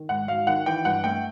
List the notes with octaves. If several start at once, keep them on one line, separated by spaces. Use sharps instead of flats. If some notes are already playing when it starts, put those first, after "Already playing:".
Already playing: D#3
G#2 F#5
F#3 F5
D#3 F#5
E3 G5
G2 F#5
A3 G5